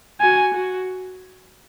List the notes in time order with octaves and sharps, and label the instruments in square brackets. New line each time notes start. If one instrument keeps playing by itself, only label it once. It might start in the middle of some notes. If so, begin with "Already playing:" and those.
[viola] F#4 [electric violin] G#5
[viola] F#4